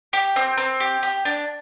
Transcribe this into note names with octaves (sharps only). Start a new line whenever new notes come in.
G4
C4
C4
G4
G4
D4